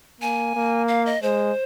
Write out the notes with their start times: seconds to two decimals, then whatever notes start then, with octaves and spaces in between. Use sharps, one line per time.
0.21 A#3 G#5
0.55 A#3
0.88 F5
1.06 D#5
1.22 G#3 C5